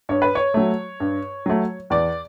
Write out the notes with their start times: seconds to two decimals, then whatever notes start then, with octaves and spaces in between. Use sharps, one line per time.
0.09 G2 C#5
0.22 B4
0.35 C#5
0.54 F#3 A3
1.00 G2
1.46 F#3 A3
1.90 E2 D5